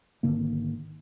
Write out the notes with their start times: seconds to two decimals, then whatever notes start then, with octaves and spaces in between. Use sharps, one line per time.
0.23 G#1 D3 D#3 A#3